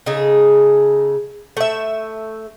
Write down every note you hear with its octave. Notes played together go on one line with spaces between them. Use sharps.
C#3 D#4 G#4 A4
A3 E5